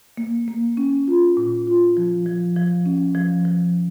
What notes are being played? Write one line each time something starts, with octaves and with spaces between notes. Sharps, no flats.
A#3
A#3
C#4
F4
A#2
F4
F3
F3
F3
C#4
F3
F3